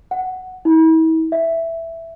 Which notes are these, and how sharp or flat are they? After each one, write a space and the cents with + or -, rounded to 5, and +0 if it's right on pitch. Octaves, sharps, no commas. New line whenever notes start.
F#5 +5
E4 -40
E5 +5